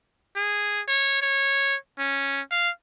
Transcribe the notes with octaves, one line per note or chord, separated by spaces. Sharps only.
G#4
C#5
C#5
C#4
F5